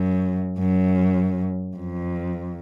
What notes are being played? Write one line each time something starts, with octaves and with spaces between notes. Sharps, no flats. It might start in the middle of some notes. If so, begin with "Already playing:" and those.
Already playing: F#2
F#2
F2